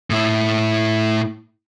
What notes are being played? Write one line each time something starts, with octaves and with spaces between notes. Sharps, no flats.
A2 E4